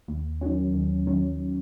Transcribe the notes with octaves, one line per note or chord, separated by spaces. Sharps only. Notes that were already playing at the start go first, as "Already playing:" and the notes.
D#2
D#3 F#3 C#4
D#2
D#3 F#3 C#4